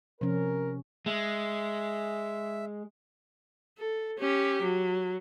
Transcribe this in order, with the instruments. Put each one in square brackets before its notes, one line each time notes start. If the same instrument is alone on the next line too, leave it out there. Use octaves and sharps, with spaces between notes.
[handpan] C3 C#4 [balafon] F3 [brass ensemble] A#4
[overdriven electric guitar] G#3 [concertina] E5
[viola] A4
C#4 G4
F#3